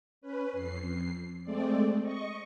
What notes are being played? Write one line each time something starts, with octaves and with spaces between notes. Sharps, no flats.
C#4 B4
F2 C7
G#3 A3 C4 D5
D#5 C#6